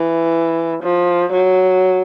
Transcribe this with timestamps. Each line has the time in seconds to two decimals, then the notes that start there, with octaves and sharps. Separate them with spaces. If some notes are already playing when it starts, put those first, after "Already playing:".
Already playing: E3
0.83 F3
1.33 F#3